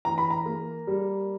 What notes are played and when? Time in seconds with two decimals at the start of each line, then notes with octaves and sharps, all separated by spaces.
0.05 E3 A#5
0.18 B5
0.30 A#5
0.46 A#3
0.87 G3